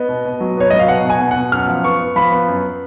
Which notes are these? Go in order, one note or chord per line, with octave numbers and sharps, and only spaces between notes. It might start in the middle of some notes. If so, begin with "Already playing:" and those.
Already playing: B3 D#5
B2
B2
F#3
B3 C#5
F#3 D#5
F5
B2 F#5
B2 G#5
B2
F#5
B2
F#2 F6
F3
B3 C#6
B3
F3 B5
B3
F#2